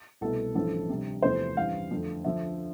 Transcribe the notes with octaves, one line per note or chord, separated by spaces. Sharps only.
C2 B2 A3 A4
A1 G2 F3 A4
D2 C3 G3
E2 C3 F3 A3 C5
A1 G2 E3 G3 F5
F2 D3 A3
D2 D3 F3 E5